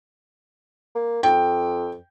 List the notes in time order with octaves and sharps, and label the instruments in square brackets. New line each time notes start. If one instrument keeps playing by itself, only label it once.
[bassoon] A#3
[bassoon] F2 [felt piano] G5